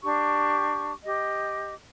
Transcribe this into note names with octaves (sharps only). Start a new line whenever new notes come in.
D4 G4 C#6
G4 D#5